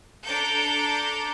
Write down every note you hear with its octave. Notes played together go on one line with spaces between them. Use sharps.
D4 A4 A#5 D6 G6 A6